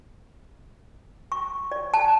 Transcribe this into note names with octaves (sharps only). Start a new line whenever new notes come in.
C#6
D5
A5